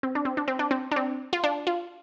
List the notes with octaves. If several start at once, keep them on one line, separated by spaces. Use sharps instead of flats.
C4
D4
C4
D4
C4
D4
C4
D4
C4
F4
D4
F4